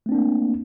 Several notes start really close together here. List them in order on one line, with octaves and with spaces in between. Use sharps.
A3 C4 D4 A#3